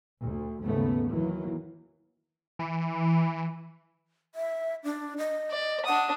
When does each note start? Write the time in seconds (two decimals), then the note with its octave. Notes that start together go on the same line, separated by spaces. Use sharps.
0.21 D2
0.62 D#2 G#2 C#3 A3 B3
1.12 D#3 E3 F#3 A#3
2.59 E3
4.35 E5
4.84 D4
5.18 D#5
5.51 D5
5.86 D4 F#5 D#6